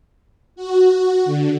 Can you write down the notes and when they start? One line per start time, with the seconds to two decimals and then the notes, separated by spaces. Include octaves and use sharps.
0.56 F#4
1.25 D3